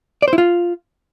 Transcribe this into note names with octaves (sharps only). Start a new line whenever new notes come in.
D5
C5
E4
F4